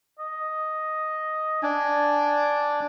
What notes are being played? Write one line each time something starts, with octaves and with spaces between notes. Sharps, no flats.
D#5
D4 G#5